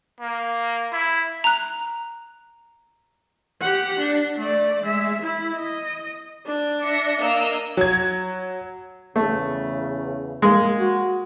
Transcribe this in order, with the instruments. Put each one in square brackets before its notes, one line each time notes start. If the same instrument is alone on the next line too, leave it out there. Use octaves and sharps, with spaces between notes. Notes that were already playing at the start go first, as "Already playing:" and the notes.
[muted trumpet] A#3
E4
[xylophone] A#5 F#6
[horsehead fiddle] G4 F#5
D4
A3 D5
G#3 E5
E4
D#5
[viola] D4
[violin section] E5 A#6 C#7
A#3 D#5 E6
[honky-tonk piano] F#3 G#6
[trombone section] E2 C#3 [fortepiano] A3
[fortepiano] G#3 A#3
[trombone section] F#4